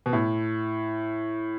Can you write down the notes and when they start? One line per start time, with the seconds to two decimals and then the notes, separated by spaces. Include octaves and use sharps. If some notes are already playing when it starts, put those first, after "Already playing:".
0.06 B2
0.13 A2